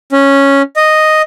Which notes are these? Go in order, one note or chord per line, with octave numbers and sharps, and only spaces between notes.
C#4
D#5